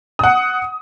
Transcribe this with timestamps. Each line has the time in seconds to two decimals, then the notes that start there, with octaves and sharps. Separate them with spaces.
0.19 F#5 D#6